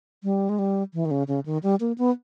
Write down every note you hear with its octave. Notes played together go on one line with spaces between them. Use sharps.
G3
G#3
G3
E3
D#3
C#3
C#3
D#3
G3
A#3
B3